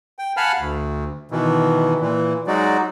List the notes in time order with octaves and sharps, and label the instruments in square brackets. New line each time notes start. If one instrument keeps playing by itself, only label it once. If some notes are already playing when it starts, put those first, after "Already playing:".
[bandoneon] G5
F5 F#5 G#5 A5 B5 F6
D2
B2 D#3 E3
A#2 E3
F#3 G#3 D#4 F#4 D5